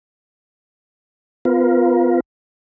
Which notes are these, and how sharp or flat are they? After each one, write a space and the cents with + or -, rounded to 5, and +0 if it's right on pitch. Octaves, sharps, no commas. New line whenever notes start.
B3 +40 F4 +0 A#4 +35